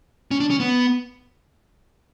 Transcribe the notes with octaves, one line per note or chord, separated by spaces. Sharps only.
C#4
D4
C#4
B3